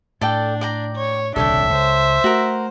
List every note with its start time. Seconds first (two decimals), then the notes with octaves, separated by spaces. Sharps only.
0.21 A2 D4 A4 D5 G5
0.61 D5 G5 A#5
0.95 C#5
1.36 D#1 C2 C#3 D4 A4 C#5 E5 G5
1.70 C#2 C5
2.24 A3 F#4 A#4